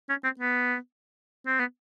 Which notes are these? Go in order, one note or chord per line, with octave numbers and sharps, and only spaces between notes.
C#4
C4
B3
C4
B3